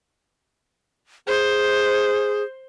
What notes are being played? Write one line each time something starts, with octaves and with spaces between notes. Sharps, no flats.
G#4 C5